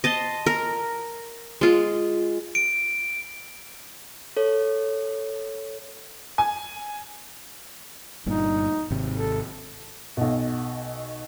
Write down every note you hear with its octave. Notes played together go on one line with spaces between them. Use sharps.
D#5 A5 C6
A#4
G#3 F4
D7
A4 C#5
G#5
G1 G2 A#2 D#4
G#1 C3
A4
B1 B2